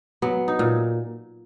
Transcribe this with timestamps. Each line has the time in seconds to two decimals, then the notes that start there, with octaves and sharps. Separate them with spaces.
0.22 F#3 B3
0.48 D#4
0.59 A#2